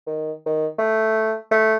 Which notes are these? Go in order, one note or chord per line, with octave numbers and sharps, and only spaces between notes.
D#3
D#3
A3
A3